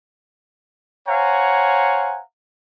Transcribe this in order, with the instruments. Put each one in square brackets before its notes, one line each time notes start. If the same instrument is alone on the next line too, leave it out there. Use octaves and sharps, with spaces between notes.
[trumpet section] C5 C#5 F5 F#5 G#5 A#5